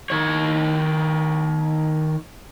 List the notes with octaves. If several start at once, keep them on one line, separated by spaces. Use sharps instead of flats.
D#3 C#5